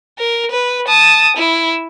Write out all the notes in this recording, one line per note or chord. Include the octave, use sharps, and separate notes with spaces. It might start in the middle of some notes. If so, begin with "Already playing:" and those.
A#4
B4
A5 D#6
E4